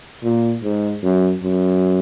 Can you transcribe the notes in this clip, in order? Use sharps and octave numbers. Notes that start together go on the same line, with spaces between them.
A#2
G#2
F#2
F#2